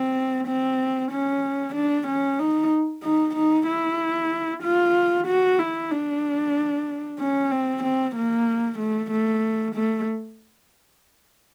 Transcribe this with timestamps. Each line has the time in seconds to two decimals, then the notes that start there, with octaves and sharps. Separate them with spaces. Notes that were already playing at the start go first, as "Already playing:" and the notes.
Already playing: C4
0.48 C4
1.11 C#4
1.75 D4
2.07 C#4
2.39 D#4
3.03 D#4
3.36 D#4
3.67 E4
4.63 F4
5.27 F#4
5.59 E4
5.91 D4
7.19 C#4
7.51 C4
7.83 C4
8.15 A#3
8.79 A3
9.11 A3
9.75 A3